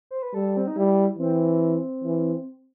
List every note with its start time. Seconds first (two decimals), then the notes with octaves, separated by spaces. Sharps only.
0.11 C5
0.23 B4
0.34 G3 A4
0.57 C4
0.67 D#4
0.77 G3 E4
1.18 E3 C4
2.04 E3